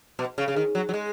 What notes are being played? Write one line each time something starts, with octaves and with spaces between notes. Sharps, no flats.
B2
C#3
C#3
D#3
F#3
F#3
G#3